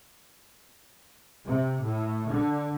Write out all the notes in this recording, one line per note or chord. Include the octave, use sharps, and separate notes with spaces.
C3
A2
D3